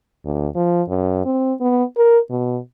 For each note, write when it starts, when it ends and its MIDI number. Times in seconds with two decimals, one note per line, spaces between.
0.25 0.48 38
0.55 0.82 53
0.88 1.21 42
1.25 1.53 60
1.61 1.83 59
1.97 2.19 70
2.30 2.59 47